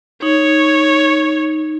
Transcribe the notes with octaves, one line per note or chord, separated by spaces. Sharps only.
D#4 C#5